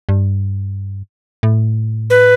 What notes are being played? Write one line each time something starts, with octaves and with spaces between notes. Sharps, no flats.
G2
A2
B4